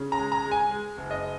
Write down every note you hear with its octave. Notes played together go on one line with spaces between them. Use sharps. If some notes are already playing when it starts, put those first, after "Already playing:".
Already playing: C#3
A#5
G#3
A#5
G#3
G#5
G#3
F#1
D#5